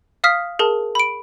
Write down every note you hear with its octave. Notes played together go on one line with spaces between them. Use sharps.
F5 D#6 F6 B6
G#4 A#4 A5
B5 D7